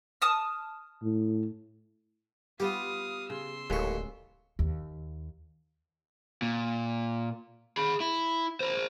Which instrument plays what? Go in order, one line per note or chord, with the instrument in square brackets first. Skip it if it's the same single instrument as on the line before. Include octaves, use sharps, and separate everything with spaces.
[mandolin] A5 D#6 F6
[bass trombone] A2
[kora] G3 B3 F4 [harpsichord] G4 [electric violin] F5 D#6
[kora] C#3 [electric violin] C6 E6
[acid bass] D1 [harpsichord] D#2 A2 C#6 [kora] G#3
[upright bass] D#2
[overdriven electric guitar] A#2
G#4 B5
E4
A#4 C5